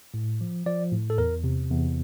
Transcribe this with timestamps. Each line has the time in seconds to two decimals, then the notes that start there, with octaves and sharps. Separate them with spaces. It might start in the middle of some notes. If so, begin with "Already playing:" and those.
0.14 A2
0.41 F3
0.66 F3 D5
0.92 A2
1.10 A4
1.18 E2 A#4
1.44 C3
1.70 E2